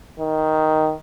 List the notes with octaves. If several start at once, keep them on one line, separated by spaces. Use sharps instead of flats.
D#3